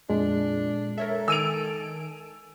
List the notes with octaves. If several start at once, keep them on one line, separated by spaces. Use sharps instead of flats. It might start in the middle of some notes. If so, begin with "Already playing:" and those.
F2 A#2 G#3 D4
A4 A#4 C#5 E5
D#3 G#5 E6 D7 D#7 F7